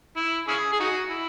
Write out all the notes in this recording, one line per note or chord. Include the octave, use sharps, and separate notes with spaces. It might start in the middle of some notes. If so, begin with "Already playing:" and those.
E4
C#4 E4 G#4
G#4
D#4 F#4
E4